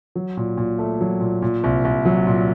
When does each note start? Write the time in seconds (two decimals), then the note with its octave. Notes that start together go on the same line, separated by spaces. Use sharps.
0.16 F#3
0.37 A#2
0.57 A#2
0.79 A3
1.01 F#3
1.20 A#2
1.42 A#2
1.64 C2
1.85 C2
2.05 F#3
2.27 A#2